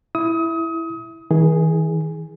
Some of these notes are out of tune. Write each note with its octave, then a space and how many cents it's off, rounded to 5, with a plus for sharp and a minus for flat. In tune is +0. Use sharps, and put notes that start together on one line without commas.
E4 +0 D#6 +30
E3 -45 G#4 +0